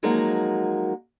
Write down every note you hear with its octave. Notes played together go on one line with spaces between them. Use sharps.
F3 F#3 G#3 A#3 D#4 F#4